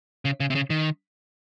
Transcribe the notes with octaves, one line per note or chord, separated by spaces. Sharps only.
C#3
C#3
C3
C#3
D#3